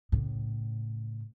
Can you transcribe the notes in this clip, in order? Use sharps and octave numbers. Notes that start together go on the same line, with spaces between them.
A2 C#3